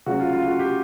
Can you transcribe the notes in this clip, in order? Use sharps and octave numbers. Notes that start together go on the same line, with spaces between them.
C#3 F#3 A3 C#4 F#4
F4
F4
F#4
G4